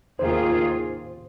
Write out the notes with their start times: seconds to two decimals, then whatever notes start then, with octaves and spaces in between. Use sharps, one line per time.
0.19 D#2 D#3 A#3 F4 G#4 C5